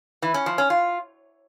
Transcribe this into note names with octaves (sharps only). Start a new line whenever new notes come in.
E3
C#4
F3
C#4
F4